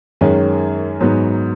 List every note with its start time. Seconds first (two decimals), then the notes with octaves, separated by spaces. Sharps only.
0.21 F#2 D#3 G#3 C#4
1.01 G#2 F#3 B3 D#4